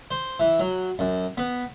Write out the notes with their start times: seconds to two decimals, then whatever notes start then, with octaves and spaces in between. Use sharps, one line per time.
0.11 C5
0.40 E3
0.60 F#3
0.99 F#2
1.37 B3